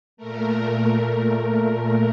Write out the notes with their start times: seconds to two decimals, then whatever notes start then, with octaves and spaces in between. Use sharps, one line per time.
0.17 A#2 A3 A#4
1.07 A#2 A3